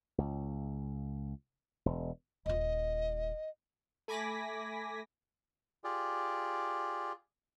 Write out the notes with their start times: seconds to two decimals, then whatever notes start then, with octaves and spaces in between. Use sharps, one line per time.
0.18 C#2
1.86 E1
2.46 D#1 F4 D#5
4.08 A3 G#5 B5 D6 A#6 B6
5.84 F4 G4 G#4 D5